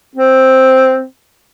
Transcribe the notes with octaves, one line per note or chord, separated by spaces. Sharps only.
C4